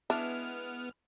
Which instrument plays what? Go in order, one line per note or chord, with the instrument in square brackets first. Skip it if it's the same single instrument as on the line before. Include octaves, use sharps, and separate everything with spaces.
[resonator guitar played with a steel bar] G#3 E4 [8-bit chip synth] B3 F6 [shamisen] D4